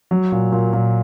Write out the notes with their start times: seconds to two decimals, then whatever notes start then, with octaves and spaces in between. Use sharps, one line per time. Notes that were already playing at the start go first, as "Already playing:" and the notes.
0.11 F#3
0.32 A#2
0.52 A#2
0.73 A#2